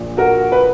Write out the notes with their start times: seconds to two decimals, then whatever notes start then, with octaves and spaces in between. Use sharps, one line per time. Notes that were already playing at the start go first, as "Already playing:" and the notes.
Already playing: A#1 A#2
0.17 F#4 A#4
0.52 B4